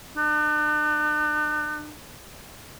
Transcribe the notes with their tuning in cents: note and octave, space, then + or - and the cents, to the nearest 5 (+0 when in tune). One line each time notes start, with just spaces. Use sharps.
D4 +40